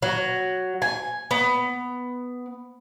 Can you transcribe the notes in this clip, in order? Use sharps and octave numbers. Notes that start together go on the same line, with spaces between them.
F#3
G#5
B3